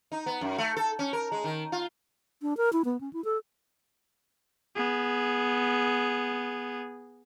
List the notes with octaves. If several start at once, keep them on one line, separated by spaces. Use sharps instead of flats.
D#4
B3
F#2
A3
A4
C#4
A#4
G#3
D#3
F4
D4
A#4
E4
B3
C#4
E4
A4
B3 G#4